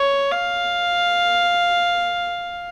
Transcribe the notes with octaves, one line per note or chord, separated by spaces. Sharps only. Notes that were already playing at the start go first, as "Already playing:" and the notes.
Already playing: C#5
F5